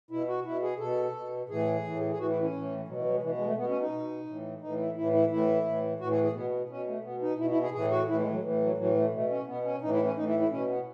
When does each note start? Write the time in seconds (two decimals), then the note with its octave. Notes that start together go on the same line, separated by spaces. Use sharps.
0.11 B2 E4
0.28 F#4
0.45 B2 E4
0.62 G#4
0.80 B2 A4
1.14 B2
1.49 A2 E3 G#4
1.84 A2 E3
2.11 G#4
2.18 A2 E3 F#4
2.30 E4
2.42 C#4
2.53 A2 E3
2.87 B2 F#3
2.96 E3
3.05 F#3
3.14 G#3
3.23 B2 E3
3.38 G#3
3.46 A3
3.57 B2 B3
3.69 C#4
3.81 D#4
3.92 B2
4.26 A2 E3
4.61 A2 E3 D#4
4.79 E4
4.96 A2 E3 E4
5.13 E4
5.30 A2 E3 E4
5.66 A2 E3
6.00 A2 F#4
6.03 E3
6.11 G#4
6.23 G#4
6.34 B2 B3
6.69 B2 C#4
6.87 A3
7.04 B2 B3
7.22 D#4
7.39 B2 E4
7.50 E4
7.62 G#4
7.74 A2 E3 G#4
7.91 F#4
8.08 A2 E3 E4
8.19 G#3
8.27 E3
8.31 F#3
8.43 A2 E3
8.60 F#3
8.78 A2 E3 F#3
8.95 A3
9.12 B2 A3
9.30 C#4
9.47 B2 B3
9.64 C#4
9.82 A2 E3 D#4
9.93 E4
10.04 C#4
10.16 A2 E3 D#4
10.28 E4
10.39 E4
10.51 B2 C#4
10.68 B3